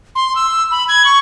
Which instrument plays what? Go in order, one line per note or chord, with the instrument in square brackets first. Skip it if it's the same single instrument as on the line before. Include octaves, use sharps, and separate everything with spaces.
[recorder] C6
E6
B5
G#6
C#6